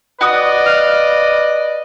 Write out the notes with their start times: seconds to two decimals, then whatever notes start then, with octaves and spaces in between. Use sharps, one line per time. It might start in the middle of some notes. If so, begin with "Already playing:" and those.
0.21 F#4 B4 D5 D#5 D#6
0.66 F5